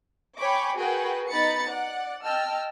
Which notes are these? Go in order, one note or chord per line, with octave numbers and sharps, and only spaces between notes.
C#5 G5 G#5 B5 C#6 D6
F#4 G#4 A#4 B4 F#5 G5
B3 D#4 B5 A6 C#7
D5 F#5
D#5 G5 A5 E6 F6